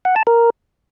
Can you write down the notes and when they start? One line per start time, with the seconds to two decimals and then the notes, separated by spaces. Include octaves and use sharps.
0.05 F#5
0.16 A5
0.27 A#4